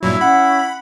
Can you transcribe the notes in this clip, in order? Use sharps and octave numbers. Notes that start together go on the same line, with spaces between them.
G2 A#2 F#3 E4
C#4 F#5 B5